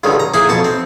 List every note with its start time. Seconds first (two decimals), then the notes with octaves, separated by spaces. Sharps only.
0.04 C#2 G2 D3 D#3
0.20 A#5
0.34 A#3 D#4 E4 G#4
0.49 F2 B2 A5 C#6
0.64 C4